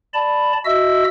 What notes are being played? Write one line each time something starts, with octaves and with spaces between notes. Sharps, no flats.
D5 A5 B5
F#4 D#5 E5 E6